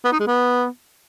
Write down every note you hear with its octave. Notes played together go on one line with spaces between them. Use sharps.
B3
D#4
G#3
B3